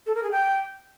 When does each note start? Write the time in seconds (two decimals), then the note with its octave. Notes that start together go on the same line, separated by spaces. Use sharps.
0.07 A4
0.15 A#4
0.23 G#4
0.32 G5